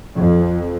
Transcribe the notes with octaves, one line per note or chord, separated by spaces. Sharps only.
F2